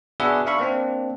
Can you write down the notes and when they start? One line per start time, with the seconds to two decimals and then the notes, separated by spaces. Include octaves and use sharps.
0.20 B3 D4 F#4 G#4 B4 E5
0.46 D4 E5 F5 B5 C#6
0.59 A#3 C4 D4